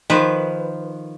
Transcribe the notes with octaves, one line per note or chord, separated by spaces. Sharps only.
D#3 F3 B4